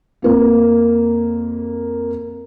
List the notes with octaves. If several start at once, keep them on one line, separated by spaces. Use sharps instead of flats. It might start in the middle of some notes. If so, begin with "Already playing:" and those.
F2 A#3